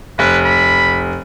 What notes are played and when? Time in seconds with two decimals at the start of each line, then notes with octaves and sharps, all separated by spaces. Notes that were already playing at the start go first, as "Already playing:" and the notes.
0.19 F1 B4
0.45 B5